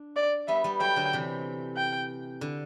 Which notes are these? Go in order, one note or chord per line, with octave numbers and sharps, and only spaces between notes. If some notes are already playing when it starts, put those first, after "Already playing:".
Already playing: D4
D5
G3 B3 E5
G3 B3
F#3 A3 G5
D3 F#3
C3 E3
G5
D3